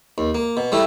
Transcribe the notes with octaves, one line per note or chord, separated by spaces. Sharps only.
D#2
A#3
B2
G3 A3 E4